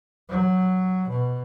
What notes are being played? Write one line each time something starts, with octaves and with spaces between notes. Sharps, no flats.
F#3
B2